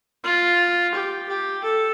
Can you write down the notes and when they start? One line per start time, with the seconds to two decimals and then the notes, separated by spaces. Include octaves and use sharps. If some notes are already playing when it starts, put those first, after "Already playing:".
0.24 F4
0.94 G4
1.28 G4
1.64 A4